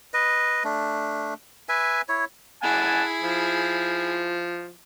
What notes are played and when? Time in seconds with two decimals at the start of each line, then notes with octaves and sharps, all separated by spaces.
0.14 B4 D#5
0.64 A3 D4
1.69 B4 E5 G#5
2.09 E4 C#5
2.63 E4 G#4 F#5 G#5 A5
3.22 F3